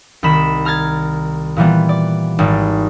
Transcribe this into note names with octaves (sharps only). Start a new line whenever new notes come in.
C2 D#3 B5 E7
A#5 F6 G#6 A6
A#2 E3 G3 B3
D5
G#1 G3